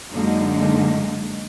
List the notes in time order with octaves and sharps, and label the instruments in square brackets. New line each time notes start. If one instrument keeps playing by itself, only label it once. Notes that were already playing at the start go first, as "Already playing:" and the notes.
[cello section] F#2 D3 G#3 A#3 D#4